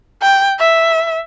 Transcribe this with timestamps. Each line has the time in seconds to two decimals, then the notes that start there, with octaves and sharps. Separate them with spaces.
0.22 G5
0.59 E5